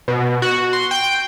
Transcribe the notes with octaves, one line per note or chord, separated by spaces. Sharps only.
B2
F#4
C6
G5